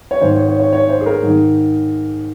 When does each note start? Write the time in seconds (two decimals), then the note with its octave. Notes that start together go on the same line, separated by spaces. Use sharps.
0.11 C#5
0.21 G#2 D#3 C5
0.34 C#5
0.47 C#5
0.60 C#5
0.73 C#5
0.89 C5
1.01 G#4
1.06 A#4
1.23 G#2 D#3